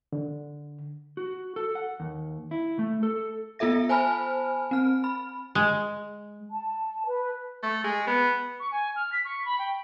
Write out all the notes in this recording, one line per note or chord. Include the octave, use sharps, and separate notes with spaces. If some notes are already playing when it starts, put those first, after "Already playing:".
D3
F#4
A4
F#5
D#2
E4
A3
A4
B3 F4 A4 E5 A#6
C5 G#5 A5 B5 F6
C4 F6
B5
G#3
A5
B4
A3
G#3
B3
C#6
G#5
F6
B6
C#6
B5
G5